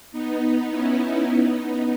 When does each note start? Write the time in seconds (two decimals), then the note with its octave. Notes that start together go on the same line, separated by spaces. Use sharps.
0.12 B3 D#4
0.70 C#4 E4
0.98 C#4 E4
1.27 B3 D#4